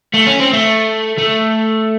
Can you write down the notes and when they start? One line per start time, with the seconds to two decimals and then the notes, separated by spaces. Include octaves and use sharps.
0.14 A3
0.27 C#4
0.40 C4
0.54 A3
1.18 A3